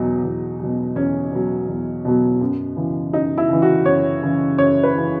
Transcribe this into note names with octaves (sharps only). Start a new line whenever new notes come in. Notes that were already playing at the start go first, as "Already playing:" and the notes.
Already playing: E2 B2 F#3 D#4
E2
B2 F#3
E2 C#4
B2 F#3
E2
B2 F#3
F#2
C#3 E3
F#2 D#4
E4
C#3 E3
F#4
F#2 C#5
C#3 E3
F#2 C#5
B4
C#3 E3